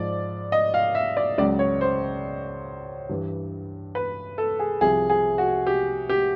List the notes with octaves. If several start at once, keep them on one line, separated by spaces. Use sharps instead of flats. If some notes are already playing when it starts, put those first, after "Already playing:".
Already playing: G#2 F3 D5
D#5
F5
E5
D5
C#2 C#3 F#3 D5
C#5
C5
G2 E3
B4
A4
G#4
C2 C3 F3 G#4
G#4
F#4
G4
G4